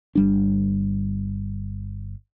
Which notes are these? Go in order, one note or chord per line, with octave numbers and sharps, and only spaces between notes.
G1 G3 D4